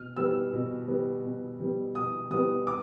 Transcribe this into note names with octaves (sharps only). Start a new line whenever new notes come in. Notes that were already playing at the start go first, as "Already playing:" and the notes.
Already playing: B2 F6
G3 B3 E6
B2
G3 B3
B2
G3 B3
B2 D#6
G3 B3 D#6
D6